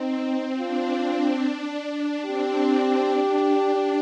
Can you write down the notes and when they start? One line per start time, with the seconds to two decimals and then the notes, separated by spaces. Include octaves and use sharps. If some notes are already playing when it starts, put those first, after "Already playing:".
Already playing: C4 D#4
0.59 D4 F4
1.42 D4
1.84 D4
2.25 C4 G4
3.08 D4